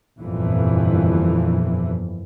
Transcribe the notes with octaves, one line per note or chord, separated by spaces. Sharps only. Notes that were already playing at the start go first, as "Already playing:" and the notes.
G1 F2 A#2 E3